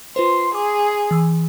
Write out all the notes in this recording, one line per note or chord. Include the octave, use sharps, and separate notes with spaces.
F4 B4 C5 C6
G#4 D6
E3 E6